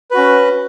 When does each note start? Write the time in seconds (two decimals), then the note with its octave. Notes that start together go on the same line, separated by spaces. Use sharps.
0.11 B4
0.14 F#4
0.17 C#4